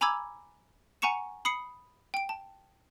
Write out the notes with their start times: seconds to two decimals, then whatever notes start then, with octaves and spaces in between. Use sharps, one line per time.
0.01 G#5 A#5 B5 D6 E6 G#6
1.02 F#5 G#5 A#5 C#6 C#7 E7
1.45 B5 D#6 C7 C#7
2.14 G5 D7
2.29 A5